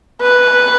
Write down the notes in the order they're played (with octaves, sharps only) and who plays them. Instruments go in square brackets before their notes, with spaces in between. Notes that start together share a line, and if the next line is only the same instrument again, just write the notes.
[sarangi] B4